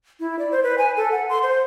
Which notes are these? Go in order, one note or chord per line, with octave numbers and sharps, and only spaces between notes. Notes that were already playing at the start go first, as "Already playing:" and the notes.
E4
D5
C5
B4
G#5
A4
F#5
C6
C5